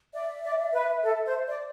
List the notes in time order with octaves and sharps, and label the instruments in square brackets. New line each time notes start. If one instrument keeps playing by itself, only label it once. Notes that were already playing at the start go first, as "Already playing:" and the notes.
[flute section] D5 [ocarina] E5
[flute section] D5
B4
A4
C5
D5